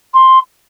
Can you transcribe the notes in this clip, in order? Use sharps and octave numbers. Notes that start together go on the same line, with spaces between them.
C6